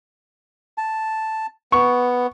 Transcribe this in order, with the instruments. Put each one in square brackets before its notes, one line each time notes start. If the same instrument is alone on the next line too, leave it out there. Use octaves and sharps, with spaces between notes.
[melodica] A5
[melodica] B3 [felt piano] C#6